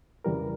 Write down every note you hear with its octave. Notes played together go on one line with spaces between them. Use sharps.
F2 C#3 E3 G3 A#4